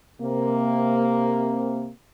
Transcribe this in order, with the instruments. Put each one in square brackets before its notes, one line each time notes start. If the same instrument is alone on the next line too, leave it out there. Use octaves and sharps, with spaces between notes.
[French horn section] C3 A#3